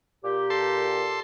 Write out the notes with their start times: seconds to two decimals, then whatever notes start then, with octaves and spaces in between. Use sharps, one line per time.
0.24 A#2 G4
0.50 A4 C6